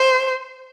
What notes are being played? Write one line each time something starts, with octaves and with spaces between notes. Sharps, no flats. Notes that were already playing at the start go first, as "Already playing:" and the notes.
Already playing: C5